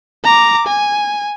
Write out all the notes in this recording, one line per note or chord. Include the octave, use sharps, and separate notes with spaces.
A#5 D6
G#5